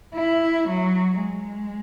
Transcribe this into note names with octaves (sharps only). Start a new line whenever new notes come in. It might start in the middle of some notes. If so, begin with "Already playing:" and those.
E4
F#3
G#3